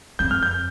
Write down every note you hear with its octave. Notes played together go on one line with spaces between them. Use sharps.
F2 G6
F6
G6